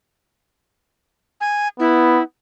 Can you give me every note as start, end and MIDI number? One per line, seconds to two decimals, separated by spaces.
1.41 1.68 80
1.80 2.19 59
1.80 2.23 64